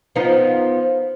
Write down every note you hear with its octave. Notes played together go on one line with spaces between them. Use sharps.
F3 B3 D#4